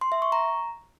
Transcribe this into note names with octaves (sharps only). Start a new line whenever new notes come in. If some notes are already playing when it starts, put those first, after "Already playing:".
C6
E5
C#6
A#5